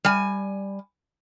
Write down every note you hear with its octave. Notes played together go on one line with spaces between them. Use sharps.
G3 G#5